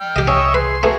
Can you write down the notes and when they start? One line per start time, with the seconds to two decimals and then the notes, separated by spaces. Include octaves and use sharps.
0.01 G5 F6
0.16 C2 G4 D#5
0.28 C#4 C#5 D#5 E5
0.54 G#4 B4 C6
0.83 A3 B3 F#4 G#4 A#4